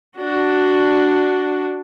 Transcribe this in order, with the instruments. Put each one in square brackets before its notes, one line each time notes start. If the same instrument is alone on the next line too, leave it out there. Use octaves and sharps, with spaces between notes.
[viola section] D4 F#4